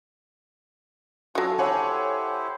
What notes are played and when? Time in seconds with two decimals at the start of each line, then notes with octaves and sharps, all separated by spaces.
1.35 F#3 C#4 F4 F#4 A4 F5
1.58 E4 G4 C5 C#5 F#5 G#5